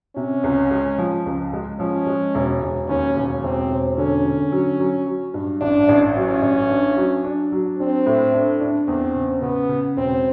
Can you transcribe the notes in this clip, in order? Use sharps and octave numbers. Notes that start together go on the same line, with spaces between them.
C3 C#4
C#2
G#3
F3
C#2
G#3
F3 C#4
G#3
E1
E1
D#2 C#4
E1
E1 C4
E1
D3 C#4
D3
F#3
F#3
F#3
G2
A1 D4
A1
F#3 C#4
A1
D4
F#3
D4
F#3
C4 D4
A2
D4
D4
E2 C4
C#3
C#3 B3
C#3
E1 C4